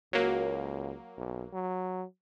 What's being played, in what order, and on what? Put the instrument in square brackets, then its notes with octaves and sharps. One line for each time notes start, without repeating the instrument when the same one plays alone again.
[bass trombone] C#2 [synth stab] F#3 A#3
[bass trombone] B1
F#3